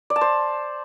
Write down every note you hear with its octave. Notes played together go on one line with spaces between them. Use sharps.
D5
A5
C5